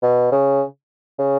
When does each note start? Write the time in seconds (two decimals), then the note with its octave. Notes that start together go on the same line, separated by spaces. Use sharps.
0.02 B2
0.32 C#3
1.19 C#3